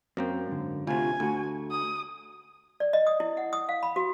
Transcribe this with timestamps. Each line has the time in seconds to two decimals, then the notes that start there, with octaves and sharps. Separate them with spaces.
0.17 F#2 A#3 C4 G5
0.47 G#2 D3
0.87 D2 C3 F4 F#4 G#5
1.20 D2 A3 F#4
1.71 D#6
2.80 D5
2.93 D#5
3.07 D#6
3.20 E4
3.37 F#5
3.53 D#6
3.69 F5
3.83 B5
3.96 F#4